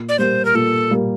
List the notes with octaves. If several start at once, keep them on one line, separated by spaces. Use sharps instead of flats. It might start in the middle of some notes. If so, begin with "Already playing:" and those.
Already playing: A#2
D5
G3 A#3 C5
A#4
A#2 A4
G3 A#3